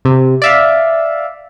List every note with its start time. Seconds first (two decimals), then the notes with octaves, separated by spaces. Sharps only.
0.05 C3
0.42 D5 E5 F5